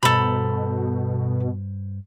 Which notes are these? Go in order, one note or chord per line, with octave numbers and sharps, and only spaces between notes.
G2 B2 A4 C5 A#5 B5